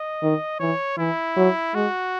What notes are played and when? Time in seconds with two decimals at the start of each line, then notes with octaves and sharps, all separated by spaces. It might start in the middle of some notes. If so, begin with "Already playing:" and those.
Already playing: D#5
0.22 D#3
0.60 E3 C#5
0.98 E3 E4
1.37 F#3
1.75 G#3 F#4